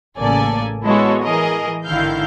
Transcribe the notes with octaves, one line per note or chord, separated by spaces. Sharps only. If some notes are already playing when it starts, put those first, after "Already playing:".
A1 C#3 A#3 A4 D5 G#5
G#3 B3 E4 F#4 A4 C#5
E3 G#4 A#4 D#5 D#6
G#1 D3 D#3 E4 F5 G6